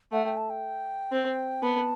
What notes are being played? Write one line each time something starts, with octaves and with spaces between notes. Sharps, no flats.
A3 F#5
G5
A5
G5
C4
B3 A5